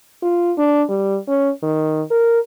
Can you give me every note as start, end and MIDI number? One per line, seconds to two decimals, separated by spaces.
0.23 0.53 65
0.58 0.83 62
0.89 1.19 55
1.28 1.50 61
1.63 2.02 51
2.11 2.39 70